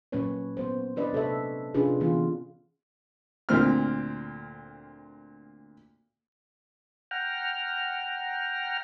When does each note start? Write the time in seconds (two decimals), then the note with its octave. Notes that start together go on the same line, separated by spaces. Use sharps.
0.12 A#2 F#3 A#3 C#4 B4 C#5
0.57 B3 C5
0.96 D4 B4 D5 D#5
1.13 C3 A4 C#5 E5
1.74 C3 C#4 D4 F4 G#4 B4
2.00 D3 E3 B3 F4
3.49 D2 A#2 C4 F6
7.11 F#5 G5 A#5 F6